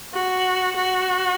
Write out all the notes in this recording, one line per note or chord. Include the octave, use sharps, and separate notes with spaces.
F#4
F#4